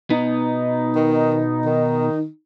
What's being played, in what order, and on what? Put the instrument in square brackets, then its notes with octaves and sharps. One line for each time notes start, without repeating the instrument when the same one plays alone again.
[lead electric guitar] B2 B3 [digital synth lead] D#4
[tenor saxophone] D#3
D#3